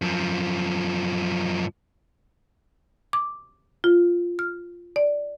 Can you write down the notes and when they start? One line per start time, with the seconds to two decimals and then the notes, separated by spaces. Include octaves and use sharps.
0.02 F#2 F3
3.13 D6
3.84 F4
4.39 F6
4.96 D5